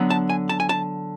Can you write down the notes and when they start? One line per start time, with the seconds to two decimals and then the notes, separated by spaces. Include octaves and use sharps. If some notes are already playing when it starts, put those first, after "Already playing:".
Already playing: D3 F#3 B3
0.10 A5
0.30 G#5
0.49 A5
0.60 G#5
0.69 A5